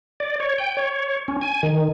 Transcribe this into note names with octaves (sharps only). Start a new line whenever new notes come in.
D5
C#5
G5
C#5
C#4
G#5
D#3